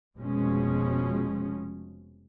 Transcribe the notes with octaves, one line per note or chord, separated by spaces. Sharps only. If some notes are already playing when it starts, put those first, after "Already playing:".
F1 B2 F3 G#3 C#4